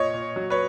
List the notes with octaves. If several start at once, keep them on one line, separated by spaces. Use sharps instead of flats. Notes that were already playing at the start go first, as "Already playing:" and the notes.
Already playing: A#2 C#5 D#5
A#2
F#3
B4 C#5